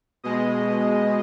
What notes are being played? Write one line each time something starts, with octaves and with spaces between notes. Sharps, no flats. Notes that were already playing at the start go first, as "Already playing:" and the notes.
B2 G#3 D#5